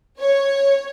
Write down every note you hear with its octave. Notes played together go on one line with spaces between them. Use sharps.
C#5